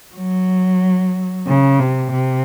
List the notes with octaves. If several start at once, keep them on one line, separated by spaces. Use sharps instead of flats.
F#3
C#3
C3
C3